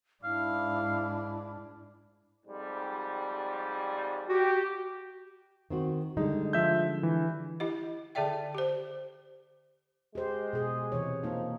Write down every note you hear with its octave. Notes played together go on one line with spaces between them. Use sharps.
G#2 D4 E4 F5
F2 G#2 G3
F#4 G4
D#3 C4 F#4
D3 G3 G#3 D#4
F3 E5 G6
E3
E4 G4 D#5
D3 G#4 A4 D5 E5 G5
G4 C5
G#3 G4 C5
B2 G#4
C3 E3 C#5
F3 A#3 D#4